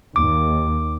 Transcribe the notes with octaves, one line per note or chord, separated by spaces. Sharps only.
D#2 D6